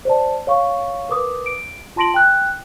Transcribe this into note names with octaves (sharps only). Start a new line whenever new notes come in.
C5 D5 A5
C#5 F5 C#6
A#4 B4 D6 D#6
D7
F4 A5 C6 A#6 D7 F#7
G5 F#6